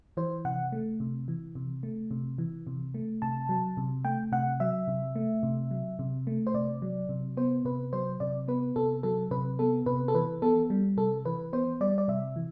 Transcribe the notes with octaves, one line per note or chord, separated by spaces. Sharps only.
E3 C5
C3 F#5
A3
C3
E3
C3
A3
C3
E3
C3
A3
C3 A5
F#3
C3
A3 G5
C3 F#5
F#3 E5
C3
A3
C3
F#3
C3
A3
C5
C3 D5
F#3
C3
B3 C5
C3 B4
F#3 C5
C3 D5
B3 B4
C3 A4
F#3 A4
C3 B4
B3 A4
C3 B4
A4
E3 B4
B3 A4
G3
C3 A4
E3 B4
B3 C5
G3 D5
D5
C3 E5
E3